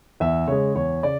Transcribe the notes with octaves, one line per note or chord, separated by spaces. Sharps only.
E2 E5
C#3 G#3 C#5
E2 C#5
C#3 D5